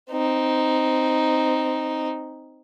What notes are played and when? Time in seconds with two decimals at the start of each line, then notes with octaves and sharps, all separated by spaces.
0.11 C4 D#4